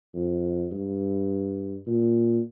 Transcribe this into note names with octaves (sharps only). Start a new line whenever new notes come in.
F2
G2
A#2